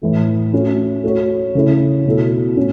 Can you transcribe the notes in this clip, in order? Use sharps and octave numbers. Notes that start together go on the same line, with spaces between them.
A2 E3 A3
A3 C#4 F#4
A3 F#4 C#5
C#3 A3 E4 C#5
B2 A3 E4 A4
A2 C#4